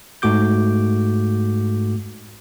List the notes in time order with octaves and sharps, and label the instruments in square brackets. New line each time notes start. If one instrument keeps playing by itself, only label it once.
[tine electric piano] G#2 A3 F#4 D6 G6